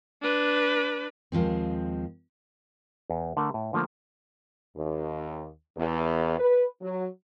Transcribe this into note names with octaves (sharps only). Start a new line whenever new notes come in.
D4 B4
D#2 F3 G#3 C4
E2
D3 A3 A#4
A2
D3 F3 A3 A#3
D#2
E2
B4
F#3